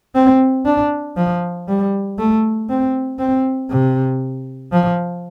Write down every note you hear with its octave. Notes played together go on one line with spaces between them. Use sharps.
C4
D4
F3
G3
A3
C4
C4
C3
F3